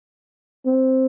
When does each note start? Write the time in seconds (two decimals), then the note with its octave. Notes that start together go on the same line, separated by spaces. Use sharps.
0.66 C4